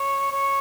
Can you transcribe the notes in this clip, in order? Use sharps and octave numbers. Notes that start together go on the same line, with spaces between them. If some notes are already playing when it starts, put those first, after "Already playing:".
Already playing: C#5
C#5